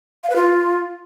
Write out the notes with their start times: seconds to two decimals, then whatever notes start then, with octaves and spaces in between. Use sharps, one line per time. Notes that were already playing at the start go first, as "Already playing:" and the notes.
0.24 F5
0.30 B4
0.36 F4